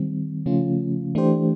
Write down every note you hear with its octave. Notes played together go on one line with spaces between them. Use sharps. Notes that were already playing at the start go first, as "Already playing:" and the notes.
Already playing: D#3 G3 C4
C#3 F3 A3 C#4 F4
E3 A3 D4 G4 C5